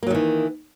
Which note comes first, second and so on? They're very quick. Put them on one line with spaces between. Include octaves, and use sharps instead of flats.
A#3 F#3 D#3 E3